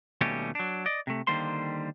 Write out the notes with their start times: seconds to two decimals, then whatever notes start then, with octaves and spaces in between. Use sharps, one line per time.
0.21 D#2 B2 G3 A3 C#4 G4
0.55 F#3 D4
0.86 D5 D#5
1.07 C3 A3
1.27 D3 D#3 G3 A#3 C5 C6